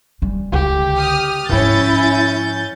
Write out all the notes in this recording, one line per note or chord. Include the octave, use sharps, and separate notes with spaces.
E3 G3
C#2 D3 G4
D#6 F6
G#2 F3 C#4 E4 G6 A6